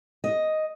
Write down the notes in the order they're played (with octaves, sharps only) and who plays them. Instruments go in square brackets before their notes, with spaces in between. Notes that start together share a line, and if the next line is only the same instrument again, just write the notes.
[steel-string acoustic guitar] D#5